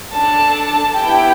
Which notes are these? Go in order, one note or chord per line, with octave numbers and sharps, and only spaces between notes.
D4 A4 A5
B3 E4 G4 G5